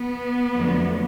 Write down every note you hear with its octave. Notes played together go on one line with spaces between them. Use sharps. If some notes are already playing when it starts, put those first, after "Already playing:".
Already playing: B3
F2 D3 F#3 A3